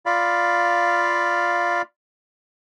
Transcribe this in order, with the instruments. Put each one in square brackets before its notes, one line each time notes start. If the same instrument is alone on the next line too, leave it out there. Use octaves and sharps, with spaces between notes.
[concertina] F4 D5 F5 B5